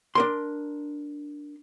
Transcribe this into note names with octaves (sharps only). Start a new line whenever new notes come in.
D4 A#4 C6